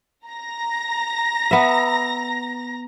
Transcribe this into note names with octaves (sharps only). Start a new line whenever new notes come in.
A#5 A#6
B3 E5